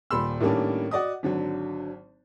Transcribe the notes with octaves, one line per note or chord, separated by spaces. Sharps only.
D#1 A#2 G3 B5 C6 E6
A2 D#3 G3 A#3 C#4 D4
F#4 D5 D#5 D#6
G#1 D3 F#3